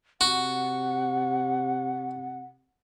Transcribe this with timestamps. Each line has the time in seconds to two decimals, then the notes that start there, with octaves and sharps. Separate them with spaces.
0.21 C3 F#4 F#5